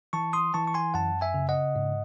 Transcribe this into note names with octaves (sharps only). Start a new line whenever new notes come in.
E3 A5 C#6
C6 D#6
E3 A5 C#6
C#6
G#5 C6
F#2 F#5 A5
E5 G#5
C#3
D#5 F#5
G#2